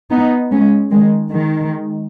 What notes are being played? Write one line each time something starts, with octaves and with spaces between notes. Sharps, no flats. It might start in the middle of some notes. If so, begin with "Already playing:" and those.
B3 D#4
G#3 C#4
D#3 G#3
D#3 G#3